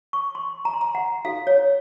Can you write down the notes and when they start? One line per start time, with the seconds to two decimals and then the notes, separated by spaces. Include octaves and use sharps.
0.13 C#6
0.35 C6
0.65 A#5
0.73 C6
0.81 A#5
0.95 F#5
1.25 D#4 F#4 A4 F5
1.47 C#5